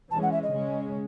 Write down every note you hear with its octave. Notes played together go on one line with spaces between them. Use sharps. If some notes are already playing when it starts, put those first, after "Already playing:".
E3 G#3 C#4 A5
F#5
E5
D#5
C#3 G#3 C#4